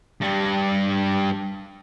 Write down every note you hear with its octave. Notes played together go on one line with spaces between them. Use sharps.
G2 G3